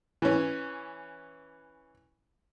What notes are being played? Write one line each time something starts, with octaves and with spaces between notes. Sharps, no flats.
E3 C#4